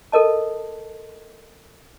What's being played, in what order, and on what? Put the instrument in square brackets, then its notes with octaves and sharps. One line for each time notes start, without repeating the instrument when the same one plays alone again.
[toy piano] A4 A#4 D#5 A5